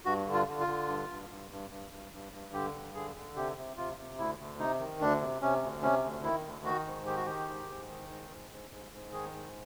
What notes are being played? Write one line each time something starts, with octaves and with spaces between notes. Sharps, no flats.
G2 F#4
D3
F4
D3
F4
D3
G2
G2
G2
G2
G2
G2
G2
G2
D3 G4
G2
D3 G#4
D3
C3 G4
C3
C3 F4
C3
D2 E4
D2
C3 D#4
D#3
D2 D4
C3
C3 C#4
D2
C3 C#4
D2
D#3 E4
D2
D#3 F#4
G#2
D#3 G4
F#4
D#3 G4
G#2
G#2
D#3
G#2
G#2
G#2
G#2
G#2
D#3 G#4
G#2